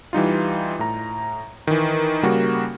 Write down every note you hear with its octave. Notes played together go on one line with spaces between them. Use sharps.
E3 G3 D#4 F4
A2 A#5
D#3 E3
C#3 G3 A#3 F#4